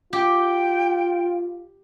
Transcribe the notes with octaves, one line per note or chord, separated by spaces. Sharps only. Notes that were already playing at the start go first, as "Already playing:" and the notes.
F4 G4 G5